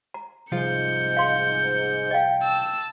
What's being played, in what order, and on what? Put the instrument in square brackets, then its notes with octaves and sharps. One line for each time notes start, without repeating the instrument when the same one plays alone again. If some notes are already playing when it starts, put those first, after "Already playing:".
[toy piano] A#5
[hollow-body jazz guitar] C2 F3 F4 [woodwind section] G#2 [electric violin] G6 C#7
[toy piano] F5 C6
[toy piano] D#5 F5 [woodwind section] G5
[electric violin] A5 E6